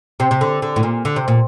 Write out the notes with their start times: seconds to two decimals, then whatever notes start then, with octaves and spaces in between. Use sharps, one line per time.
0.20 C3
0.31 C3
0.41 D3
0.62 D3
0.76 A2
0.83 A#2
1.05 D3
1.16 C3
1.28 A#2